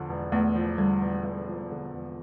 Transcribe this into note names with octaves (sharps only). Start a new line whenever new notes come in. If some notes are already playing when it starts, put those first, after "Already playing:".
Already playing: E2 D3 F3
E1
E2 A3
F3
D3 G3
E1
E2
F3
D3
E1